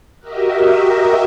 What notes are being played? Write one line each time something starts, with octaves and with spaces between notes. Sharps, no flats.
F#4 G4 A#4 D#5 E5